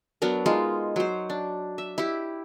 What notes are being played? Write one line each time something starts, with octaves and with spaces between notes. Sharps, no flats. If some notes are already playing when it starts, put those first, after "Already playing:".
F#3 B3 D4 A#4
G#3 D#4 F4
F#3 C5
D4
E5
E4 G4